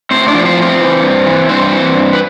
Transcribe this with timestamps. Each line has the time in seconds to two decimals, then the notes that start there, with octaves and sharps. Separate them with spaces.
0.11 A2 C4 C5
0.28 D4 D5
0.34 F3
0.45 C4 C5
0.57 A2
0.62 C4 C5
0.80 E3
1.03 G2
1.26 E3
1.49 G2 C4 C5
1.72 E3
1.95 G2
2.13 B4